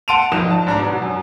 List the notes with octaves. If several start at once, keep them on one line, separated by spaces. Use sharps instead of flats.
F#5 A5 C6 D7 D#7 F7
G#1 F2 D#4 E7
A5
G#2 D4 A#5
B2 F#3
F#2